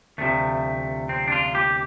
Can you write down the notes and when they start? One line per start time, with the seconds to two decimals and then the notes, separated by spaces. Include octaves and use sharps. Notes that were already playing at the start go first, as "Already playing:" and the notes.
0.18 D2 C3 F3 A3
1.09 C4
1.28 D4
1.32 F4
1.55 G4